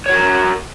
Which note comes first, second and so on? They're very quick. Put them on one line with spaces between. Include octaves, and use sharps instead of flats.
C#5 F#4 A#4